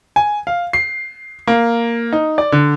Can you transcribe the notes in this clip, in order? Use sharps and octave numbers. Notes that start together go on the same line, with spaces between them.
G#5
F5
C7
A#3
D#4
D5
D3